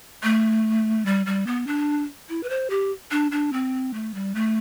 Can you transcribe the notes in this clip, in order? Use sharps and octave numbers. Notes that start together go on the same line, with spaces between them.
A3
G3
G3
B3
D4
E4
B4
C5
G4
D4
D4
C4
A3
G3
A3